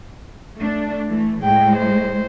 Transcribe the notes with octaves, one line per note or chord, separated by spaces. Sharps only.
A3 D4
E3 A3
A2 G#3 G5
C5